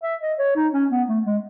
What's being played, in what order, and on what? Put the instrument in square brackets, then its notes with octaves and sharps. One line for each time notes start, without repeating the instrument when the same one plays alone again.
[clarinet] E5
D#5
C#5
D#4
C#4
B3
A3
G#3